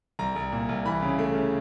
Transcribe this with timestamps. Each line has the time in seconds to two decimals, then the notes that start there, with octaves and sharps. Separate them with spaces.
0.19 C2 A#5
0.36 C2
0.52 A#2
0.69 C2
0.85 E3 B5
1.02 C#3
1.19 A3
1.35 C#3